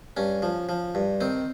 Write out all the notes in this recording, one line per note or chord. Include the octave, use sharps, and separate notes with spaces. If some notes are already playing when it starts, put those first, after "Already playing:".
G2 C#4
F3
F3
G2
D#3 C4